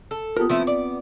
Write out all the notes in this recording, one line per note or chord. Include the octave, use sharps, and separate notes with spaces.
A4
B3 F4 G4 A#4 A5 D#6
F3 A3 B3 C4 E4 E5
D5